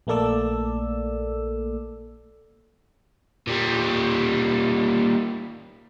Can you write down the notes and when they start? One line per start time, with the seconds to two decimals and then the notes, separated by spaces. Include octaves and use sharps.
0.07 A#1 A3 A#3 A4 D5 E6
3.47 A#2 G3